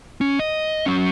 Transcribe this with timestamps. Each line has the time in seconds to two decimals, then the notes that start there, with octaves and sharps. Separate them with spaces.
0.21 C#4
0.39 D#5
0.86 F#3 C#4